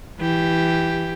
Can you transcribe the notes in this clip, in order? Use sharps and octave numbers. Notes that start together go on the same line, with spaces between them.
E3 G4